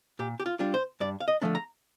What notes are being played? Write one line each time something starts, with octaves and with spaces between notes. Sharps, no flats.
A#2 G4
G4
F4
G3 D4 F4
C5
G2 D5
F5
D#5
D3 F3 A3 D4
A#5